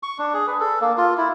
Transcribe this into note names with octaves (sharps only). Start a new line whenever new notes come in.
C#6
D4
G#4
B4
A4
A#3
F4
E4